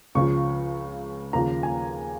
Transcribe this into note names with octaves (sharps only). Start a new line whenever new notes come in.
C#2 C#3 F3 C#6
D#2 C#3 F3 A#5
G#5